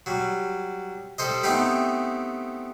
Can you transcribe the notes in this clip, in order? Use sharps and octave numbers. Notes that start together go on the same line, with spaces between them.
F#3 G3
G3 A4 C5 D#5
A3 B3 C4 D#4 G4 B4